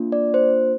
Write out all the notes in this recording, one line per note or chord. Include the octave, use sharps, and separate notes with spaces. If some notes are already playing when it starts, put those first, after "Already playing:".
Already playing: A#3 D4 F4
D5
C5